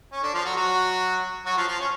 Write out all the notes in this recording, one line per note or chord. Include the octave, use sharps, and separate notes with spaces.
C#4
D3 D4
F3 F4
F#3 F#4
F#3 F#4
F#3 F#4
F3 F4
F3 F4
C#4